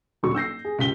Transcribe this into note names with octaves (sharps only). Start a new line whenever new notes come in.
D#1 D3 F#3 F#4 A4 C#6
E6 G6 A#6 C7
G#4
C#2 G4 B6 G7